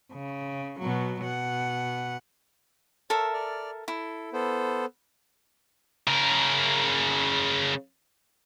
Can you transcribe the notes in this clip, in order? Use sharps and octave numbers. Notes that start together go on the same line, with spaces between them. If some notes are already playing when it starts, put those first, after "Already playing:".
C#3
B2 F#3
B2 F#5
A4 A#4 C#5 E5
D5 F6
E4 A4
B3 A4 C5
C#3 A#4